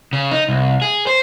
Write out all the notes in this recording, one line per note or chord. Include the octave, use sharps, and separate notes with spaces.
C#3
D#4
C2
G#4
C5